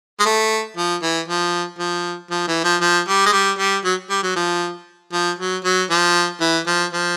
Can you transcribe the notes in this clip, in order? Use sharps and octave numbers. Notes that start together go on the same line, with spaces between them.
G#3
A3
F3
E3
F3
F3
F3
E3
F3
F3
G3
G#3
G3
G3
F#3
G3
F#3
F3
F3
F#3
F#3
F3
E3
F3
F3